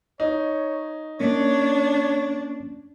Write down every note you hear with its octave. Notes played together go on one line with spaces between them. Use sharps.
D#4 C#5
A#3 C#4 D4 C#5